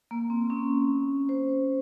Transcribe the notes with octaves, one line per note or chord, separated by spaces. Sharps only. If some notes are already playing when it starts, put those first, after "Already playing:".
A#3
C4
C#4
C5